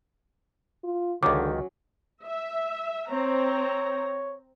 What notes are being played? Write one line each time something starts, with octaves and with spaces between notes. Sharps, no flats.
F4
C#2 D3 D#3 F#3 C#4 D6
E5
C4 C#5 A#5